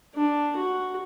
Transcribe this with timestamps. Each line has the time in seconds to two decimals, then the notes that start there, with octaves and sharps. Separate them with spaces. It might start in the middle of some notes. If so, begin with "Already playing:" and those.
0.15 D4
0.56 F#4